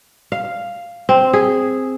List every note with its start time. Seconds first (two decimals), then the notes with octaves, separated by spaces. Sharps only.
0.32 F5
1.09 C4
1.33 G#4